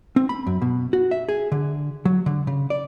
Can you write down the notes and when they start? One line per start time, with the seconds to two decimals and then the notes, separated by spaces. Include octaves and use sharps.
0.16 C4
0.29 B5
0.47 F#2
0.62 B2
0.93 F#4
1.11 E5
1.29 G#4
1.52 D3
2.05 F#3
2.26 D3
2.47 C#3
2.70 D5